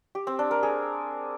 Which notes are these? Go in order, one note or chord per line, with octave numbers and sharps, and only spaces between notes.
G4
C4
D4
A#4
G#4